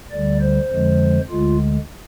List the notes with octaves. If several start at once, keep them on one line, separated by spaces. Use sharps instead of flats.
D2 D3 G3 D5
C5
F2 D3 F3 G#3
D2 D3 G#3 F4